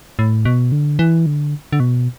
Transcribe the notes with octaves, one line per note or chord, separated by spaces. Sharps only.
A2
B2
D3
E3
D3
D3
B2